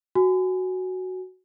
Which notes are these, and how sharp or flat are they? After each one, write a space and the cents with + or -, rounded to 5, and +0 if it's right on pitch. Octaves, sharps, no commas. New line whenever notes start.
F#4 +0 G#5 +0